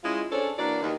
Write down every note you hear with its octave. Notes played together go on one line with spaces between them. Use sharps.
G#3 C#4 E4 F4 D#5
C#4 D4 G#4 A4 C5 C#5
E3 A#3 D4 F#4 D5
D#2 D#3